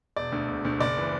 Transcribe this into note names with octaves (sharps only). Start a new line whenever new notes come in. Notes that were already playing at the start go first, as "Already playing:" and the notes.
E1 D5
D2 D3
E1
D2 D3
F#1 D5
E3